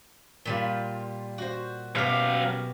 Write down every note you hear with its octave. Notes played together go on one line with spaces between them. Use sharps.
A#2 G3 F4
F#4 C5
F#2 B2 G4 F5